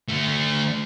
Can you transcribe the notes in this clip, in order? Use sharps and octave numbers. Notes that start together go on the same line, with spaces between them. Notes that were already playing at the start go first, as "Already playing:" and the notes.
D3 A3